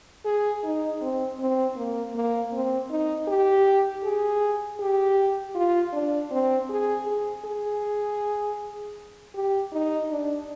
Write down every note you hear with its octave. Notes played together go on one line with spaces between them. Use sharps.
G#4
D#4
C4
C4
A#3
A#3
C4
D#4
G4
G#4
G4
F4
D4
C4
G#4
G#4
G#4
G4
D#4
D4